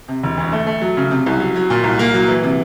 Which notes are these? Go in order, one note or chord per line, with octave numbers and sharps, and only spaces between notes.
C3
E1
D2
A3
A3
F#3
C#3
C3
C2
F#3
F#3
A#2
C2
A#3
F#3
E3
C3